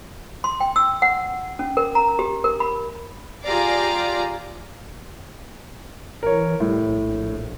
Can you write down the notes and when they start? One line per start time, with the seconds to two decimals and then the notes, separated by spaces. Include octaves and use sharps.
0.44 C6
0.60 G5
0.76 E6
1.02 F#5
1.59 C#4
1.77 A#4
1.95 A#5
2.19 G4
2.44 A#4
2.60 B5
3.45 F4 G4 G#4 D5 F5 A#5
6.23 E3 A#4 C#5
6.60 A2 G3
6.89 A#1